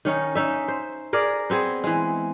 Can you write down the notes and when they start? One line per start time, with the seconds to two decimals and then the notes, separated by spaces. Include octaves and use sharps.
0.05 D#3 C#4 D#4
0.35 C#4 D#4 E5
0.68 C5
1.13 G#4 A#4 D5
1.50 B3 C4 G#4
1.84 E3 G#3